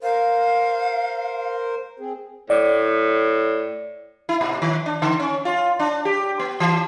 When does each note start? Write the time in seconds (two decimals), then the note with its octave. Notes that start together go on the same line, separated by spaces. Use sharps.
0.03 A#4 C5 F5
2.00 C4 G#4
2.50 A2 D5
4.29 E4
4.41 A#2
4.62 D#3
4.86 D4
5.02 D3
5.20 C#4
5.45 F4
5.79 D4
6.05 G4
6.39 B3
6.60 E3